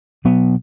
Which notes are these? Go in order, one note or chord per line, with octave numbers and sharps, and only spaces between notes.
B2 F#3 B3